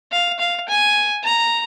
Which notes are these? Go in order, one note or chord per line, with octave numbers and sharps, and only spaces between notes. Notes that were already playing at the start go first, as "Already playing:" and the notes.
F5
F5
G#5
A#5